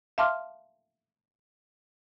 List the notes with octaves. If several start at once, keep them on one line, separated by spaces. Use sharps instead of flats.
E5 F5 A5 C6 D6 F6